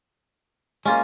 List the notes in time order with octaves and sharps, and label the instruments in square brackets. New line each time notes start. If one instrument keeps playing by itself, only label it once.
[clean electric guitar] G#3 A#3 [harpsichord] C#4 F4